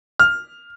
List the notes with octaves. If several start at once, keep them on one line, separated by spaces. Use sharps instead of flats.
F6